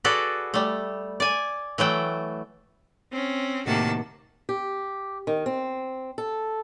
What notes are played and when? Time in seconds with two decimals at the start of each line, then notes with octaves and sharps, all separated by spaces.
0.04 F#4 G#4 A4 B4 D5
0.54 G3 A3
1.20 D5 G#5
1.78 E3 F#3 A3 G5
3.11 C4 C#4
3.66 A2 C3 D#3 A#3 F#4 A5
4.49 G4
5.27 D#3
5.46 C4
6.18 A4